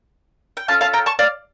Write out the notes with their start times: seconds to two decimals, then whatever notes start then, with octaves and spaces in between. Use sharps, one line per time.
0.57 G5
0.68 C#4 F4 A4 F5 A5
0.81 F5 A5
0.94 G5 A#5
1.06 A5 C#6
1.19 D5 F5